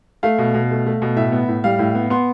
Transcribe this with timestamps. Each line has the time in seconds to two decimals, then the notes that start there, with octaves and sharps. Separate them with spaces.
0.23 A3 F5
0.38 B2
0.54 B2
0.71 A3
0.86 A3
1.02 B2
1.16 A2 E5
1.32 B3
1.48 A2
1.64 G3 F5
1.79 A2
1.95 B3
2.10 B3 C6